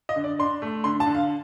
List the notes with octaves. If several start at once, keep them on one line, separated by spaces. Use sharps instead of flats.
D#5
D3
D5
D4 C6
A3
D3 C6
A5
D3
F5